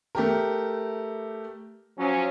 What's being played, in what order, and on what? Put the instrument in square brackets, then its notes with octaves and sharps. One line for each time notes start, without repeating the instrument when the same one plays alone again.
[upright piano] A3 G4 A#4
[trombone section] F3 F#3 C#4